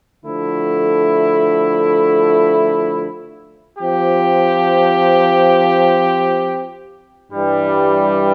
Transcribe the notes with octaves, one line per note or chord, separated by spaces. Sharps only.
D3 F3 A3 E4
F3 C4 G4
G2 E3 G3